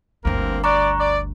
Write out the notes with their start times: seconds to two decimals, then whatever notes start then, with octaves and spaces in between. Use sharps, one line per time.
0.25 G1 D2 A#3 C4 A#4
0.64 D5 A#5 C#6 F#6
0.99 D5